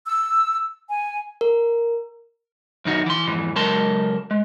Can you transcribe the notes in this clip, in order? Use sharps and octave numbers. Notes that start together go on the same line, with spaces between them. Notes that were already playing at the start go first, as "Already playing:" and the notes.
E6
G#5
A#4
F#2 D#3 D#4 F#4
E3 C6
F2 G#2 E3
C#2 F#3 G#3 A#4 A5 C6
G#3